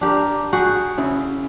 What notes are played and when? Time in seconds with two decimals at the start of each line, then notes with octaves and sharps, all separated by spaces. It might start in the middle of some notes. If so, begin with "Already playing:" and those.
0.01 D4 G4 A#4
0.53 F#4 G#4 G5
0.98 C#3 E4 E5